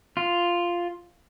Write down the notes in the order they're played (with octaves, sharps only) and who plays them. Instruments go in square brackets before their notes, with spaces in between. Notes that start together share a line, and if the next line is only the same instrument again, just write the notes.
[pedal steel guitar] F4